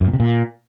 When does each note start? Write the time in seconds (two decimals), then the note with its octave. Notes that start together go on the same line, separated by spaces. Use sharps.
0.01 F#2
0.07 A#2
0.13 C3
0.20 A#2